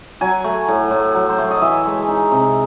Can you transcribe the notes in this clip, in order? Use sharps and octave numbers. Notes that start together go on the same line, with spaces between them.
F#3 G#5
A3
A2
A2
F#3
C5
A3 C#5
D#5
E3 E5
G#3
D#4
C3